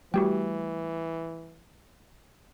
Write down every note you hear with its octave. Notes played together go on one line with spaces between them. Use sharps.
E3 G3 A3 F#4 G4 G5